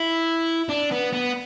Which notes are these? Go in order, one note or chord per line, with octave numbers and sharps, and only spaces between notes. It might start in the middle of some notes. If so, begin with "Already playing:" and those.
Already playing: E4
D4
B3
B3